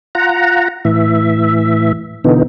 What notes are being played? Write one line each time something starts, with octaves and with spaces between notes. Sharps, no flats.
F4 F#5 A#5
A2 E3 E5
B2 D3 E3 B3 D#4